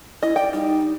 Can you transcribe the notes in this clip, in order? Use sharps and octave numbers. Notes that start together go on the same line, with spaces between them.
E4 D#5
D5 G5
G3 D#4